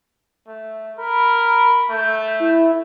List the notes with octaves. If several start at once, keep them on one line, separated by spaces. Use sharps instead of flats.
A3
A#4 B5
B5
A3 G6
E4